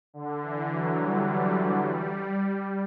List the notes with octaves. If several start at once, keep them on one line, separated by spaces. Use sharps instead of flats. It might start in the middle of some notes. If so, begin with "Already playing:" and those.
D3
E3
F#3
G3
F#3
G3